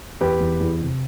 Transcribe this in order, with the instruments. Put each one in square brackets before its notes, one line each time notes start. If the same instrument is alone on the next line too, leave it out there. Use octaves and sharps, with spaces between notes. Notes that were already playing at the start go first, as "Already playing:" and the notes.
[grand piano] E2 [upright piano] G4 B4
[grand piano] E2
E2
C3